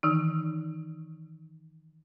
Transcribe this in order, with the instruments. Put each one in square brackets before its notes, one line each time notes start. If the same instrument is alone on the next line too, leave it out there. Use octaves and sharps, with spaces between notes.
[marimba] D#3 E3 D#4